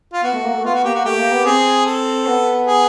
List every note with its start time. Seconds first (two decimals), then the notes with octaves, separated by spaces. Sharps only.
0.13 F4
0.23 B3 F#4
0.34 A3
0.44 A#3
0.54 A3
0.64 B3 F4
0.74 F#4
0.84 A#3 G4
0.95 F#4
1.05 A3 G4
1.18 A#3
1.32 B3
1.45 C4 G#4
1.86 A4
2.27 B3
2.67 G#4